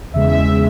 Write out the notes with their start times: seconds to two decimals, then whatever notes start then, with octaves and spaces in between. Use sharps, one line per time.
0.14 E2 C#3 G#3 E5
0.32 E5
0.51 C#3 G#3